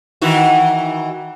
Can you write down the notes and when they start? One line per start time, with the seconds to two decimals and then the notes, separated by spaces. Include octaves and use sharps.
0.22 D#3 E3 F#4